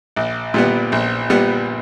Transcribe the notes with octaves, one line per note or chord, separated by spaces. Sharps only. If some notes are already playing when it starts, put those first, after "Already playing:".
A#1
A#2 G3 B3
A#1
A#2 G3 B3